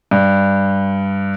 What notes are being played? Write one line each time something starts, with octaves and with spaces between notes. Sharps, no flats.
G2